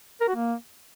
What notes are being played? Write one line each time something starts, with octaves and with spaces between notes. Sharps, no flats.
A#4
F#4
A#3